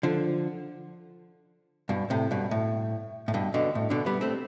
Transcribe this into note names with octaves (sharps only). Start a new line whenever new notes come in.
D3 F3
G2 B2
A2 C3
G2 B2
A2
A2
G2 B2
B2 D3
A2
B2 D3
G3 B3
A3 C4